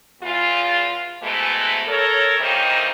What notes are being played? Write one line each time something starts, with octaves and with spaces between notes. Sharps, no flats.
E2 F4
G#2 B2 E3 G#3 A3
A4 A#4 C#5
D#3 E3 G3 A#3 C4 D#4